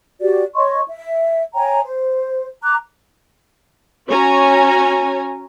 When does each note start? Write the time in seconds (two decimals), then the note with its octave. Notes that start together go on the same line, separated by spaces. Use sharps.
0.21 F#4 G4 D5
0.55 C#5 D#5 C6 C#6
0.88 E5
1.55 C#5 G5 G#5 A#5
1.84 C5
2.63 A#5 D6 F#6
4.08 C#4 F#4 C#5 G#5 A#5